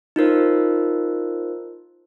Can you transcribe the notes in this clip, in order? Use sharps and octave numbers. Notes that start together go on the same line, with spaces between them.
D#4 F4 A#4 C5